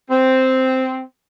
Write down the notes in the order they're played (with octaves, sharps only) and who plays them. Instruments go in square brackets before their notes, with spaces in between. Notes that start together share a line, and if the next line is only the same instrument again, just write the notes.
[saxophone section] C4